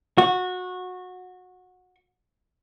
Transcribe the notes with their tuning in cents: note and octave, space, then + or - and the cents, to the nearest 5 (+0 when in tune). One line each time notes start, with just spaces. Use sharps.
F#4 -20